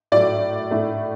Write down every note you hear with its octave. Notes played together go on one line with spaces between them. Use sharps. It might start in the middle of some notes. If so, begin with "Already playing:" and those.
A2 F#3 A3 D5
A2 A3